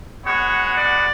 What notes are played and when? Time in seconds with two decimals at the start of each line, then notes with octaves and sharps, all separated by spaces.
0.24 G#3 B3 F#4 C#5
0.75 D5